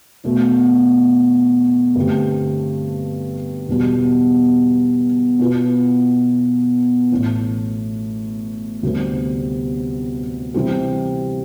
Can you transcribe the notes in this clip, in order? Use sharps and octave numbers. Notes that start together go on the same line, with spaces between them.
E2 B2 A3
G2 D3 A3 C4 G4
E1 E2 B2 G3
B2 B3 F4 B4
A1 A2 E3
D2 C3 G3 B3
C3 E3 G3 C4 G4